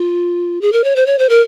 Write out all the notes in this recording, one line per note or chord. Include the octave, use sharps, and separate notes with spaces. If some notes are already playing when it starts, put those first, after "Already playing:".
Already playing: F4
G#4
A#4
C#5
C5
C#5
C5
A#4